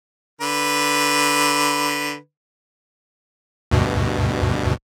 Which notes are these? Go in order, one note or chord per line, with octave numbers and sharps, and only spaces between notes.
D3 B4
D2 G2 B2